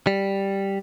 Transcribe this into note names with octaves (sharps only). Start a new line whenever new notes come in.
G3